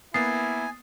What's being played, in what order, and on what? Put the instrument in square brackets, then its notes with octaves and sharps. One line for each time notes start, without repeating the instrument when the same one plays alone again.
[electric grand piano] A#3 B3 [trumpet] E4 [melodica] G#5 [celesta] D#6 A6 C7